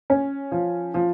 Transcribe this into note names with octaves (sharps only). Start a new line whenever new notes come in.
C#4
F3
F3